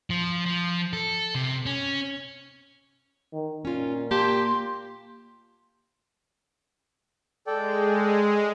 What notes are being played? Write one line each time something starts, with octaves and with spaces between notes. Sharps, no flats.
F3
F3
A4
C3
C#4
D#3
A#2 C#4 F4
A#3 G4 A5 C6
G#3 A4 D5 G5